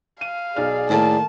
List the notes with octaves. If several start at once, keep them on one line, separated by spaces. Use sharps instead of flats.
F5 D#7
B1 D#4 G#4 D5 F6
A2 D#3 A3 A#3 A5